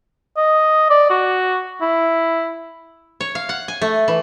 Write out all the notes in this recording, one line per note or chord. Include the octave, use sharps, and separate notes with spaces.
D#5
D5
F#4
E4
C#5
F5
F#5
G#5
A3
E3